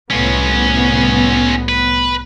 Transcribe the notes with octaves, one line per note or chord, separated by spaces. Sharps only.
C2 A2 B3 C#4 F4
B4